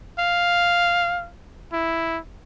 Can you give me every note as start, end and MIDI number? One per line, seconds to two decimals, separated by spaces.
0.19 1.28 77
1.73 2.18 64